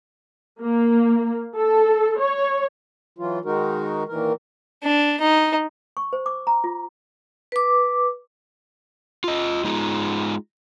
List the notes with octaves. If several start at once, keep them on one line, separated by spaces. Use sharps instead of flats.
A#3
A4
C#5
E3 F#3 F4
D#3 G#3 D#4 F#4 A#4
A#2 D#3 E3 A#4
D4
D#4
C#6
C5
D6
A#5
F4
B4 D6
F4 D#5
G#3 D#4 F4 G#4